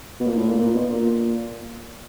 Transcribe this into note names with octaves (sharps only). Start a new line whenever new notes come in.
B2
A#2
A2
A#2
A#2
B2
A#2